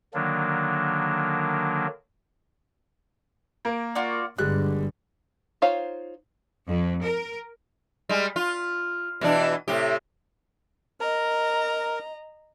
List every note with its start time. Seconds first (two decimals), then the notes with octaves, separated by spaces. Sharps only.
0.14 D3 D#3 F#3 A#3 D4
3.65 A#3 A#4
3.95 F4 F#4 D5
4.38 G1 D3 G3 G#3 F#6
5.62 D#4 F4 C5 C#5 F5
6.67 F2
7.03 A#4
8.09 G3 G#3
8.36 F4
9.21 B2 E3 D4
9.68 A2 C3 G4
11.00 A#4 D#5 A#5